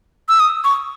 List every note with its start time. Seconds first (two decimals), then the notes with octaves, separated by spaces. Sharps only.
0.29 E6
0.40 D#6
0.64 C#6